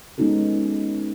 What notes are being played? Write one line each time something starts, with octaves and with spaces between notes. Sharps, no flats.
G#3 B3 C#4 D#4 F#4 A4